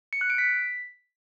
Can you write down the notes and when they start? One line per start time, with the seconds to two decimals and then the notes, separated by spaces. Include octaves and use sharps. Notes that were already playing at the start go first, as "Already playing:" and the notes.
0.13 C#7
0.21 F#6
0.30 D7
0.38 B6